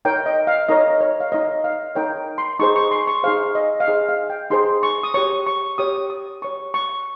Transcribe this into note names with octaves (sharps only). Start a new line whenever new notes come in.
D#4 A#4 C#5 G5
D#5
F5
D#4 A#4 C#5 D#5
C#5
F5
D#4 A#4 C#5 D#5
F5
D#4 A#4 C#5 G5
C6
D#4 G#4 C5 C#6
C#6
C6
C#6
D#4 G#4 C5 F5
D#5
F5
D#4 G#4 C5 D#5
F5
G5
D#4 G#4 C5 C6
C#6
D#6
G4 C#5 C#6
C#6
G4 C#5 D#6
D#6
G4 C#5 C#6
C#6